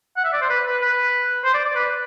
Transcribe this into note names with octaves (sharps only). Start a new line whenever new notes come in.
F#5
E5
D5
C5
B4
B4
B4
C5
D5
D5
B4